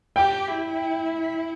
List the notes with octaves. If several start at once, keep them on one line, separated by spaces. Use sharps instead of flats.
G4 G5
E4